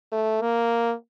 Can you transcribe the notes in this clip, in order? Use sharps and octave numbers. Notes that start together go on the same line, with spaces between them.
A3
A#3